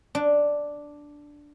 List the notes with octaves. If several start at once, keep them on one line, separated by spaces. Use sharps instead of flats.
D4